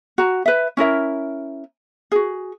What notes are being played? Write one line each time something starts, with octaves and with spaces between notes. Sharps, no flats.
F#4 A#5
B4 E5
C#4 E4 A#4 E5
F#4 G#4